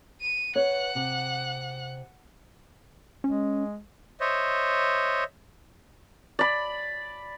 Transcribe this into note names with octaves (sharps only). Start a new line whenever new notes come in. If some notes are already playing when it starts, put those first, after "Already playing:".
D#7
B4 C#5 F#5 F#6
C3
G#3 C#4
C5 C#5 D#5 E5
D5 B5